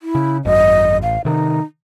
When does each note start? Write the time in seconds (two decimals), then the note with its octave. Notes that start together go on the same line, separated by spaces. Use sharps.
0.02 E4
0.15 C#3
0.45 G#1 F#2 D#5
1.03 A1 F5
1.25 C3 D#3 D#4